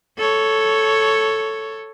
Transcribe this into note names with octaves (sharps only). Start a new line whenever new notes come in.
A4 C#5